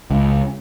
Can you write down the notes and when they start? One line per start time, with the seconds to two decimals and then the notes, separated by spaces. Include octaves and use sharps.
0.11 C#2